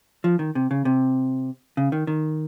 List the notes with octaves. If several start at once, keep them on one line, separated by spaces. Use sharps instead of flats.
F3
D#3
C3
C#3
C3
C#3
D#3
D#3